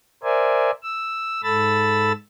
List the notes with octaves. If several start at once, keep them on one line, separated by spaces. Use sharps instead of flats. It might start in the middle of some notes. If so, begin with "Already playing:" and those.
A#4 C5 D5 E5 G#5
E6
G#2 A4 B5 E6 A6